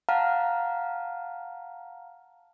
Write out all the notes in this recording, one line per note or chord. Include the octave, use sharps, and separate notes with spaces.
F5 F#5 A5 A#5 F6